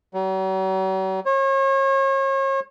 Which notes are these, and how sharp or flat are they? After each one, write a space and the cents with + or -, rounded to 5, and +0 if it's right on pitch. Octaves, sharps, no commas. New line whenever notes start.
F#3 +45
C#5 -40